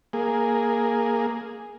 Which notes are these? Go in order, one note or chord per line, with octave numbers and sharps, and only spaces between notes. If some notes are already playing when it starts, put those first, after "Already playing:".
A#3 G#4